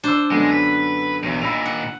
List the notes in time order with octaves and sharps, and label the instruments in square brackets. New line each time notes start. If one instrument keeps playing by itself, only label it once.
[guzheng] D4 C5 [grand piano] A5 E6
[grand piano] F#2 D3 B3 [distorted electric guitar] G#3
[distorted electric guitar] B4
[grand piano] B1 D#7 [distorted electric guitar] E2
[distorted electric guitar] D#2 A#2 [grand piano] B5 E6 F7
[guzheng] F#5